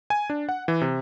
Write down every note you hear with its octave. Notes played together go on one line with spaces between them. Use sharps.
G#5
D4
F#5
E3
C3